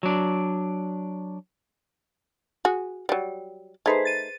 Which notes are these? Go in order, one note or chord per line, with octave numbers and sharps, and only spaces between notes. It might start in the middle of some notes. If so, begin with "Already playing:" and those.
F#3 D4
F#4 G#4
F#3 G3
A3 D#4 G#4 B4 C5
A6 D#7